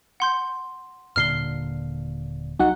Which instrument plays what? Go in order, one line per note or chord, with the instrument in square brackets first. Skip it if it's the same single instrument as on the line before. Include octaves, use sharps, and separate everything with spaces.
[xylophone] F#5 C6 G6
[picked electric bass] D#1 A#2 D3 [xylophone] F6 C7 G7
[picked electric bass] C2 F#3 [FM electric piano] D#4 F#4 F#5